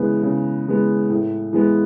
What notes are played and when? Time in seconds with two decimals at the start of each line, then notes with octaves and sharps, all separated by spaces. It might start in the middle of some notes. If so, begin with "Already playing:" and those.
Already playing: C#3 E3 G#3 B3
0.23 C#3
0.67 E3 G#3 B3
1.10 A2
1.53 E3 G#3 B3